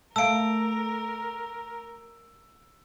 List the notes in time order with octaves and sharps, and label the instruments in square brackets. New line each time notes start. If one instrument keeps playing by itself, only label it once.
[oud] A3 [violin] A#4 [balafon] F5 A5 [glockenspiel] E6 D7